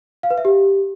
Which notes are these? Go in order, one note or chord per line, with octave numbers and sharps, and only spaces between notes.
F5
B4
E5
G4